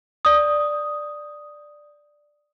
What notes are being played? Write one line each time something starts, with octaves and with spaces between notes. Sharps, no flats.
D5 D#6